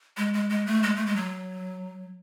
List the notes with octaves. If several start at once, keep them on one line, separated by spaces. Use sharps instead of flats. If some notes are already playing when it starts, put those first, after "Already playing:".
G#3
G#3
G#3
A3
G#3
A3
G#3
F#3